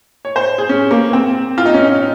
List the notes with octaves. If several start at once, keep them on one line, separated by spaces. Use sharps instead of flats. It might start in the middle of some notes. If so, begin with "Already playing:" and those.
C#5
C5
G#4
C#4
A#3
C4
F4
D#4
C#4
D#4